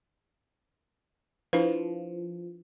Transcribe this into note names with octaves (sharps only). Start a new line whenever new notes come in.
F3 D4 E4 B4